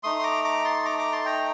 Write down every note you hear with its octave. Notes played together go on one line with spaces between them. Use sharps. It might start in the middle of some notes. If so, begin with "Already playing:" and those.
A3 D#4 C6 D#6
C6
A#5 D6
A#5 D6
A5 C6
A#5 D6
A#5 D6
A5 C6
G5 A#5